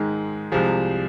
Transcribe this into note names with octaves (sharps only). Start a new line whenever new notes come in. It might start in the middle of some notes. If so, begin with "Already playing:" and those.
Already playing: G#2 D#3 G#3
C2 C3 F3 G#3